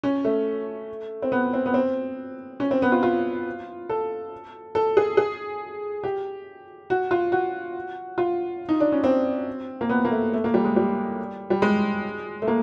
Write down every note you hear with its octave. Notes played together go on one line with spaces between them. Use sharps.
C#4
A3
C4
B3
C4
B3
C4
C#4
C4
B3
F4
F4
A4
A4
G#4
G#4
G4
F#4
F4
F#4
F4
D#4
D4
C#4
C4
A#3
B3
A#3
A3
A3
A#3
G3
G#3
G3
G3
G#3
A3
A#3